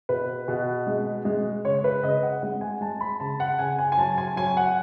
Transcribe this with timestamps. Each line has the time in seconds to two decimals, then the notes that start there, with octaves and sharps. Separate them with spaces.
0.09 B2 B4
0.48 B2
0.87 G#3
1.25 G#3
1.65 C#3 C#5
1.84 B4
2.03 C#3 D#5
2.23 F#5
2.43 G#3 F#5
2.61 G#5
2.81 G#3 A5
3.01 B5
3.20 C#3 A5
3.40 F#5
3.58 C#3 G#5
3.78 G#5
3.92 G#5
3.97 F#3 A5
4.18 G#5
4.36 F#3 G#5
4.57 F#5